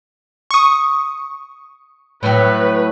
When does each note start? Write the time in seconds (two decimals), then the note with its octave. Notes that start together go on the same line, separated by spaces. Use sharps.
0.51 C#6 D#6
2.23 A2 F#3 B4